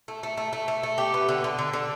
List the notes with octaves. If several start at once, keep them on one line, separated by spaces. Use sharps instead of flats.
A3
A3
A3
A3
A3
A3
G4
B3
D3
D3
D3
D3